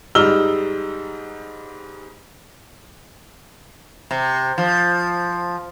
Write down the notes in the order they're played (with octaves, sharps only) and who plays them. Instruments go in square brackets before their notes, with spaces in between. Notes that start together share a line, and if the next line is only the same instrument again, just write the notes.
[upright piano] G#2 G3 D#4 E6 F6 G7
[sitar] C3
F3